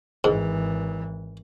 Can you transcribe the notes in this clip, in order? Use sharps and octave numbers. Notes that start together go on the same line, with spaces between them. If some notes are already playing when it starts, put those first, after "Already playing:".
G#1 G#2 E3